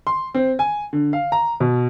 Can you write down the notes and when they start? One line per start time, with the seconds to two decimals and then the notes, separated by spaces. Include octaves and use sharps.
0.07 C6
0.34 C4
0.59 G#5
0.93 D3
1.13 F5
1.32 A#5
1.60 B2